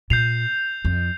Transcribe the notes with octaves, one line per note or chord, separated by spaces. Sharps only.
A#2 G6 C7 F7
F2